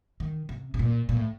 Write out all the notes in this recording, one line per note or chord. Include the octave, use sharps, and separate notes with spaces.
D#3
C3
C3
A#2
A#2
A2